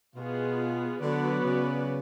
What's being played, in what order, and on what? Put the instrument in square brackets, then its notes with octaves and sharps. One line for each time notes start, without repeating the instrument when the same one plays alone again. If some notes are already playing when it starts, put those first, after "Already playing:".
[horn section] B2 [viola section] B3 F4 G#4
[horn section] D3 [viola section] F#3 B3 F#4 B4 D5
[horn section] C#3